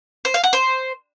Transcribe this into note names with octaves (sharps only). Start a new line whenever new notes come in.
C5
F5
F#5
C5